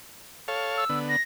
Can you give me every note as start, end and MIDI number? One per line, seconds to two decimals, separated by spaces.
0.48 0.85 69
0.48 0.85 73
0.48 0.85 77
0.77 0.99 88
0.89 1.16 50
0.89 1.16 59
1.09 1.22 94